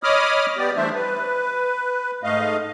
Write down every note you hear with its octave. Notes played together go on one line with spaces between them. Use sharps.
C#5 D#5 B5 D6 D#6 F6
B3 G4 D5
E3 G3 A3 D4 C5 E5
B4
G#2 A3 D#5 F5